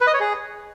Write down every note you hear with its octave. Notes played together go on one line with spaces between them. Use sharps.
B4
D#5
C#5
G#4